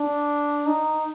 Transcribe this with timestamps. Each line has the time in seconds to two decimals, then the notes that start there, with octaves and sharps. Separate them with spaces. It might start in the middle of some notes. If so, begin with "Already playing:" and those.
Already playing: D4
0.67 D#4